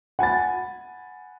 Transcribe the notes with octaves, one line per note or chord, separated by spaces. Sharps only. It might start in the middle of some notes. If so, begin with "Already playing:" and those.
F#5 G#5 B5 A6